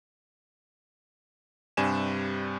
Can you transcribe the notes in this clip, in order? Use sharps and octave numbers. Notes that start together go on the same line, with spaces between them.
G2 C3 G3 G#5 E7